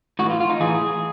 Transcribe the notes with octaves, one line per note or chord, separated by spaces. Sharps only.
A2 E3 F#4
F4
F4
D#4
A2 E3 G#4